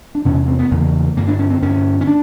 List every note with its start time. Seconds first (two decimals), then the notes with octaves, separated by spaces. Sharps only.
0.15 D4
0.25 E2 C3 C#4
0.48 C4
0.59 B3
0.71 E2 C#3 A#3
1.17 G2 D3 A#3
1.27 D4
1.39 C#4
1.50 C4
1.62 G2 D3 C#4
2.01 C#4
2.07 D4